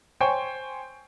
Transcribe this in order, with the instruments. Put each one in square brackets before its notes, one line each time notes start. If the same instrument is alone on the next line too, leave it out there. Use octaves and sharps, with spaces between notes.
[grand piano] C5 C#5 G5 G#5 C#6